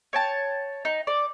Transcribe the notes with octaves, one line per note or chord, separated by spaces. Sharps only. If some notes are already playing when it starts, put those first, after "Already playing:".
C#5 G5 A5
D#4
D5